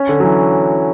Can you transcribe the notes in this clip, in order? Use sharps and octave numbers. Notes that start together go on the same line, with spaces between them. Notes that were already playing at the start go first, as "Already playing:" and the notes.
Already playing: C#4
D3
F#3
E3